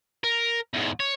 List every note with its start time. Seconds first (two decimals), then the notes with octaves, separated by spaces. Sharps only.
0.24 A#4
0.74 E2 G#2
1.00 C#5